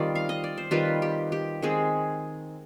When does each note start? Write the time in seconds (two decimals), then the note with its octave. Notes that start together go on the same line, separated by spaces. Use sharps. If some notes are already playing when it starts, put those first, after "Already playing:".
Already playing: D#3 G3 C4 F4 D5
0.15 F5
0.29 D#5
0.44 D5
0.58 C5
0.71 D#3 G3 C4 F4 B4
1.02 G4
1.32 G4
1.62 D#3 G#3 C4 G#4